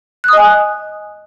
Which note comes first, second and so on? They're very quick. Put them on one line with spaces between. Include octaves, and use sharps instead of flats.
F#6 D#6 D#5 G#5